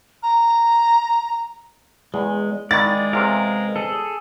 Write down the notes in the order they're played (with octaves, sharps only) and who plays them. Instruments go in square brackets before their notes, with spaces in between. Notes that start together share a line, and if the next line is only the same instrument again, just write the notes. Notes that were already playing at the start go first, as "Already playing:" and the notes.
[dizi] A#5
[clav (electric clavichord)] E2 [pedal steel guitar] G#3
[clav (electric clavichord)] D#3 E4 [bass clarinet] G#3 [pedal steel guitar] D5 [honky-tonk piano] A6
[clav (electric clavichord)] E2 C3 [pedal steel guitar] A#4 F5
[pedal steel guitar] G#4 A4